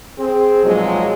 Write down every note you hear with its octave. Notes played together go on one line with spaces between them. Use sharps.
C4 G#4
B1 A#2 F3 F#3 G#3